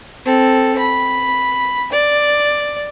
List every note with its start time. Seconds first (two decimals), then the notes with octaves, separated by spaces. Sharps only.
0.25 C4 A4
0.79 B5
1.92 D5